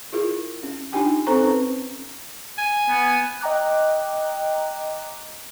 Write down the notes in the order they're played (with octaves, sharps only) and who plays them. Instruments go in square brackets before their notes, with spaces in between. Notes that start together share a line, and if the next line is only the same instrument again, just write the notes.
[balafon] E4 F4 G#4 A#4
C#4
D4 D#4 F4 G4 G5 G#5
C4 D#4 A4 C5 A#5 C#6
C#4 B4
[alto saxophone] G#5
[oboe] B3
[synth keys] D#5 G5 A#5 D6 F#6